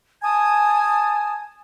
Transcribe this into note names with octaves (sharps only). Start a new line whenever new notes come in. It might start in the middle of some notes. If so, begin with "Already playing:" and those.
G#5 A5 D#6 G#6